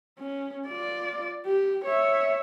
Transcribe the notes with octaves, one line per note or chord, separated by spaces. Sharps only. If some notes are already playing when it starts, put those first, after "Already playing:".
C#4
F4 D5
G4
C#5 E5